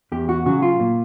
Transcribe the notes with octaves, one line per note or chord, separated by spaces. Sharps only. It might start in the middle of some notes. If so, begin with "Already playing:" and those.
E2 G4
F#4
C#3 F#3 F#4
F4
A#2